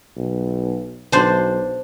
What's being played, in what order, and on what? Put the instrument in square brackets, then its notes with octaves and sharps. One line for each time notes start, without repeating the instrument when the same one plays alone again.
[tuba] B1
[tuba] B1 [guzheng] D4 C5